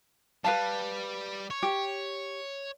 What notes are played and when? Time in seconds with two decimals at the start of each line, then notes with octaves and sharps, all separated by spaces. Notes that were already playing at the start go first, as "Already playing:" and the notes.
0.44 G3 B4 F5 A5
1.51 C#5
1.63 G4